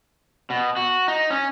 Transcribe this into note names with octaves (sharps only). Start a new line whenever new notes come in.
B2
F#4
D#4
C#4